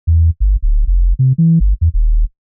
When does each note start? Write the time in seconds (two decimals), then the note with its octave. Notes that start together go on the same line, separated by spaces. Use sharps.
0.07 E2
0.40 G1
0.62 D1
0.87 F1
1.19 C3
1.38 E3
1.60 G1
1.81 E2
1.94 D#1